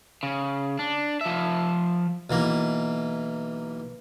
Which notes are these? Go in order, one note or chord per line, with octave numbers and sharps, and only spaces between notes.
C#3
D4
F3 E5
B1 E3 A#3